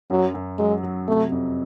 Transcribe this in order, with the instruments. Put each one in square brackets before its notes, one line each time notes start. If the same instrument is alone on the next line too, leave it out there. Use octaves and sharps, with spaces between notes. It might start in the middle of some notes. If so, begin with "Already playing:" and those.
[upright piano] F#2 [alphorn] F#3
[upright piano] F#2
[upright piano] F#3 [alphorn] G#3
[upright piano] F#3
[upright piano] C3 [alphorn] A3
[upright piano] F2